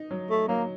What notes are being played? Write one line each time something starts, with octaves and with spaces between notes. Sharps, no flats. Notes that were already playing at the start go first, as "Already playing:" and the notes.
Already playing: D#4
F#3
A3
F#3 A#3